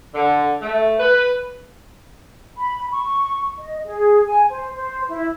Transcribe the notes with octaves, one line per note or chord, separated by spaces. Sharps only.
D3
A3
B4
B5
C#6
D#5
G#4
G#5
C5
C5
E4